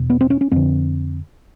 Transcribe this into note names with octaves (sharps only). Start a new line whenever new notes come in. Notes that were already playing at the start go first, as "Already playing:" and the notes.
Already playing: E2 B2
B3
C4
C#4
C#4
F2 D3 C4